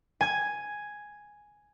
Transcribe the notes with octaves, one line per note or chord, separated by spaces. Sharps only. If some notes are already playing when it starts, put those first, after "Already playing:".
G#5 G#6